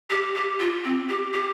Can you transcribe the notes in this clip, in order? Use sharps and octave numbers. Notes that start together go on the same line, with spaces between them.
G4
G4
F4
C4
G4
G4